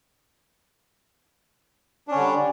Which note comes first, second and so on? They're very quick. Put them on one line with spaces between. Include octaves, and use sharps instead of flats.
D4 C#4 D3 G3